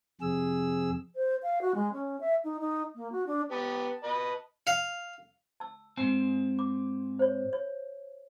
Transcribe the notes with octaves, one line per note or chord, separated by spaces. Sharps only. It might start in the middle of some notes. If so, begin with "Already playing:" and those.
F2 C3 G#4 E6
C5
F5
F#4
G#3
C#4
E5
D#4
D#4
A#3
F#4
D4
B3 G4 A5
B4 D#5
F5
A5 E6
G#2 C4 G#5
D6
C5 C#5
C#5